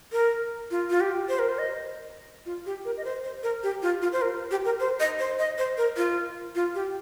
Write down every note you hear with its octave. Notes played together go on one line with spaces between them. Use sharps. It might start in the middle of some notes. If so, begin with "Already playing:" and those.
A#4
F4
F4
G4
C5
A#4
C5
D#5
F4
G4
A#4
D#5
C5
C5
A#4
G4
F4
F4
C5
A#4
G4
A#4
C5
D#5
C5
D#5
C5
A#4
F4
F4
G4